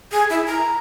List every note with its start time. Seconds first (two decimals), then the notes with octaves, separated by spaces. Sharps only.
0.12 G#4
0.30 E4
0.47 A#5